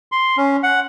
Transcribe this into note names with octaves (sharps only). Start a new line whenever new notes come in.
C6
C#4
F#5